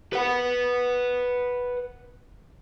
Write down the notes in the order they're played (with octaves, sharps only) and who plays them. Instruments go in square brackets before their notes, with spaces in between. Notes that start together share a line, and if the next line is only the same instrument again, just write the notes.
[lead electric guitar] B4 F#5